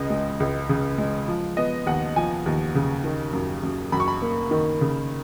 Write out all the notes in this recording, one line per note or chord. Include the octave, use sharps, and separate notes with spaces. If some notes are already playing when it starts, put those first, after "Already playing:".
Already playing: C#2 C#3 D#5
G#3
C#2
C#3
G#3
F3
B3 D#5
D#2 F#5
F3 G#5
D#2
C#3
D#3
F#2
F#2
F#2 B5
C#6
B5
A#3
D#3
C#3